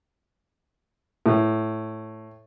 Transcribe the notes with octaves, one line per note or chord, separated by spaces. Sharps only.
A2